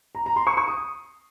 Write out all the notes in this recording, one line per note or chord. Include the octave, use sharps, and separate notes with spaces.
A#5
A#5
C6
C#6
C#6
D#6